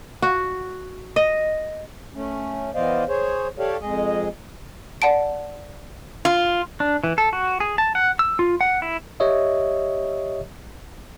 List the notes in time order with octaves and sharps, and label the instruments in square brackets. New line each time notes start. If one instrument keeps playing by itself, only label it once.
[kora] F#4
D#5
[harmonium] A3 C#4
E3 B3 C5 D5 D#5 F5
G#4 C5 C#5
G4 A4 C#5 D5 F5
F2 G#3 G#4 D#5
[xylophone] D5 F#5 A5 D7
[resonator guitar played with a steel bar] F4
[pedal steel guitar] D4
E3
A4
F#4
G#4
A5
F#5
E6
F4
F#5
E4
[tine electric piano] G4 C#5 D#5 E5